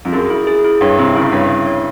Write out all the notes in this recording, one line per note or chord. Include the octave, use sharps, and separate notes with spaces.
F2
F#2 G#4
E4
G#4
E4
G2 C#5
C3 E4
C#3 E4
G2 C#5
E4
C#5